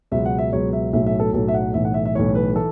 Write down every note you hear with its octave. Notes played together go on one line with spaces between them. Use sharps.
C#2 B2 F#3 E5
F#5
E5
C#2 B2 F#3 C#5
E5
B1 A2 F#3 E5
E5
A4
B1 A2 F#3 A4
E5
F#5
B1 A2 E3 E5
F#5
E5
E5
B1 A2 E3 C#5
B4
E3 A4